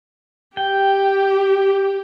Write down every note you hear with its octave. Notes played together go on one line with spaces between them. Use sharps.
G4 G5